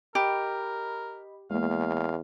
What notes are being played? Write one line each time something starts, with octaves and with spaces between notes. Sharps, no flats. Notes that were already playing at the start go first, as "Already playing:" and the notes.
G4 A#4 D#5 B5
E2 G#3 A#3 F5